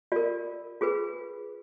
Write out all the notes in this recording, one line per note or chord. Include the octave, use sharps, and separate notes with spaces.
F4 A#4 D5
F4 G#4 B4